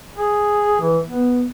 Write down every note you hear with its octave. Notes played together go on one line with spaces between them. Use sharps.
G#4
E3
B3